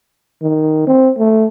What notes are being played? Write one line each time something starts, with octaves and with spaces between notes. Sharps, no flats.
D#3
C4
A3